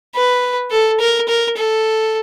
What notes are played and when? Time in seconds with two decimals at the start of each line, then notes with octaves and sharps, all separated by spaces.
0.15 B4
0.71 A4
1.00 A#4
1.28 A#4
1.57 A4